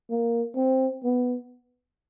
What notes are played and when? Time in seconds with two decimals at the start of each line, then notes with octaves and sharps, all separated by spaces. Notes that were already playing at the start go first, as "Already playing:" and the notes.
0.10 A#3
0.56 C4
1.04 B3